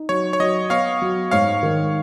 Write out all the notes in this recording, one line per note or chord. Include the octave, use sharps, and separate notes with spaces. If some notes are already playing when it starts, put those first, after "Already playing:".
Already playing: D#4
F#3 C#5
C#5
F#3 D#5
B3 C#5 F5
F#3
G#2 C#5 F5
D#3